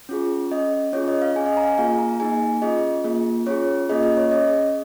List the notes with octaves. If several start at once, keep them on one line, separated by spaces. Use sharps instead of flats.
C#4 F4 G#4
C#4 G#4 D#5
C#4 F4 G#4 C#5
D#5
F5
C#4 G#4 G#5
D#5
A#5
F5
G#5
A#3 F4 G#4 F5
A#5
A#3 D#4 G#4 G#5
C#4 F4 G#4 D#5
A#3 F4 G#4
C#4 F4 G#4 C#5
A#3 C#4 F4 G#4 D#5
D#5
C#5
C#4 G#4 D#5